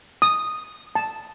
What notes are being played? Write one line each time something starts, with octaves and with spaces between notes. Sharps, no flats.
D#6
A5